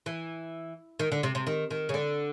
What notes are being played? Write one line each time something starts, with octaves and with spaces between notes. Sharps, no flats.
E3
D#3
D3
C3
C3
D#3
D#3
C#3
D3